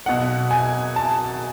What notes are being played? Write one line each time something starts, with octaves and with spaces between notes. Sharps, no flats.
B1 B2 F#5
G#5
A5